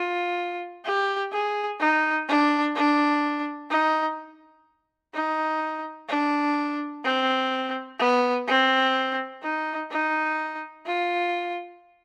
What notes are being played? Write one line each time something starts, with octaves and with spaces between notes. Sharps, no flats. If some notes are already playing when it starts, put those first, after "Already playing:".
Already playing: F4
G4
G#4
D#4
D4
D4
D#4
D#4
D4
C4
B3
C4
D#4
D#4
F4